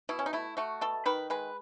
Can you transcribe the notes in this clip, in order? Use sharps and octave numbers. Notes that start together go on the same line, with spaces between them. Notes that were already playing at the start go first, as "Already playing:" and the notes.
B2 E4
C#4
D#4
A3 E4
A3 F#4
B2 A4
D#3 B4
G#3 B4